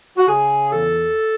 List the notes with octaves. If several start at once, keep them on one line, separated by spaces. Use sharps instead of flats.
F#4
C#3 G#4
E2 A4